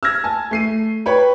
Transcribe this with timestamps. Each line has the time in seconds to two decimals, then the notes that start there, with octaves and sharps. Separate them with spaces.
0.03 E6 F6 G#6 A#6
0.24 G#5 A5
0.51 A3 C7 D#7
1.06 B4 C#5 G5 B5